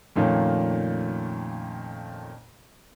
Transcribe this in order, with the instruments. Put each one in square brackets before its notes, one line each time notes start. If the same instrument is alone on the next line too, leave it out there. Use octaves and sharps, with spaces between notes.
[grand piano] F2 A#2 D#3 A3 A#3 C#4